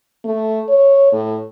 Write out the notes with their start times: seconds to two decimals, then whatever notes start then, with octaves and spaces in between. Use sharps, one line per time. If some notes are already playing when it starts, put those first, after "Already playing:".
0.25 A3
0.69 C#5
1.12 A2